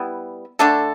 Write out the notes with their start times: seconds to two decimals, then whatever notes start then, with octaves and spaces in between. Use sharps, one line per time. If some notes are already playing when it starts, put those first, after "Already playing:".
Already playing: G3 B3 E4
0.59 D3 A3 D4 A4